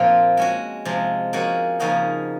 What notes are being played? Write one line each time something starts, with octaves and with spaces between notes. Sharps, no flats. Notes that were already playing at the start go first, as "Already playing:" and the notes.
Already playing: A#2 F3 C4 F4
G#3 C#4 F#4
C3 F3 G#3
F3 A#3 C#4 F#4
C#3 F3 A#3 D#4 F#4